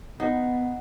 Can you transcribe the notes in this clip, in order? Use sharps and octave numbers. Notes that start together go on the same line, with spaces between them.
B3 D#4 F#5